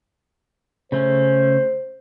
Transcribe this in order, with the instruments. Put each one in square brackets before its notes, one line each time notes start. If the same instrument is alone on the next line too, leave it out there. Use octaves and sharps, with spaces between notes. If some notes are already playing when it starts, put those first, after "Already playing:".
[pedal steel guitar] C#3 A3 C#4 [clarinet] C5